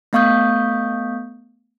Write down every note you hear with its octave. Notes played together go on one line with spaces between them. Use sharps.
A3 B3 F5 C#6 D#6 G6